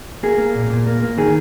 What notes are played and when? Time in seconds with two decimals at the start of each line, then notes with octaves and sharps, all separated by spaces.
0.23 A#3 G#4
0.38 A#3
0.55 A#2
0.70 A#2
0.87 A#3
1.03 A#3
1.18 D#3 G#4